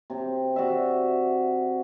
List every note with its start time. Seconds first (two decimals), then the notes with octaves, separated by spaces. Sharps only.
0.10 C3 G4
0.56 F#4 D5 E5